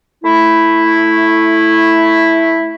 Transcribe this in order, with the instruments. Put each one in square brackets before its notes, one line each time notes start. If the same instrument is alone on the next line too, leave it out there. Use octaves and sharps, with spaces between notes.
[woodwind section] A3 E4